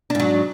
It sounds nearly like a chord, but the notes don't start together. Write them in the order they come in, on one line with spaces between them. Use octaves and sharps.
D4 G#2 F#3